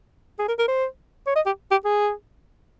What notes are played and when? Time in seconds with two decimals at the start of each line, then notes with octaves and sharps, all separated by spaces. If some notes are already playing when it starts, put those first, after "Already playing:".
0.39 G#4
0.48 A#4
0.59 A#4
0.68 C5
1.27 C#5
1.36 D#5
1.46 G4
1.71 G4
1.85 G#4